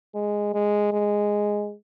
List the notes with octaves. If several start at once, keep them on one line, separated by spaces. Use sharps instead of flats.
G#3
G#3
G#3